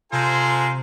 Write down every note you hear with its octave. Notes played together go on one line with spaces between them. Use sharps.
C3 G#3 F4 A4 C5 G#5 A#5